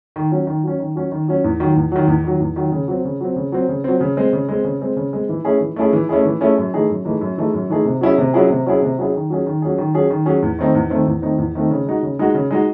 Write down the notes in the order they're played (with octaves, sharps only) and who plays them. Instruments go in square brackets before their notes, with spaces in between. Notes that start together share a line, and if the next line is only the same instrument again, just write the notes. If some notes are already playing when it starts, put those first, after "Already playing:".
[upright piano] D#3
F#3 C#4
D#3
F#3 C#4
D#3
F#3 C#4
D#3
F#3 C#4
E2
D#3 F#3
E2
D#3 F#3
E2
D#3 F#3
E2
D#3 F#3
C#3
F#3 C4
C#3
F#3 C4
C#3
F#3 C4
C#3
F#3 C4
C#3
G#3 C4
C#3
G#3 C4
C#3
G#3 C4
C#3
G#3 C4
E3
A3 C#4 E4 G#4
E3
A3 C#4 E4 G#4
E3
A3 C#4 E4 G#4
E3
A3 C#4 E4 G#4
F#2
E3 A3 D#4 G#4
F#2
E3 A3 D#4 G#4
F#2
E3 A3 D#4 G#4
F#2
E3 A3 D#4 G#4
C3
F#3 C#4 E4 G#4
C3
F#3 C#4 E4 G#4
C3
F#3 C#4 E4 G#4
C3
F#3 C#4 E4 G#4
D#3
F#3 C#4 G#4
D#3
F#3 C#4 G#4
D#3
F#3 C#4 G#4
D#3
F#3 C#4 G#4
E2
D#3 A3 C4 D#4
E2
D#3 A3 C4 D#4
E2
D#3 A3 C4 D#4
E2
D#3 A3 C4 D#4
C#3
G#3 D#4 F#4
C#3
G#3 D#4 F#4
C#3
G#3 D#4 F#4